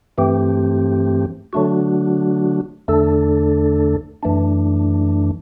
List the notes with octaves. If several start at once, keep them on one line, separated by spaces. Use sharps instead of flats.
G2 E3 A3 C4 G4
D3 F#3 A3 D4 F#4
E2 D3 A3 D4 A4
F#2 E3 A3 D4